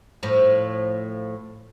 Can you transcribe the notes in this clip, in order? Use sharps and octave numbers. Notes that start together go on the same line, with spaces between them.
A2 F3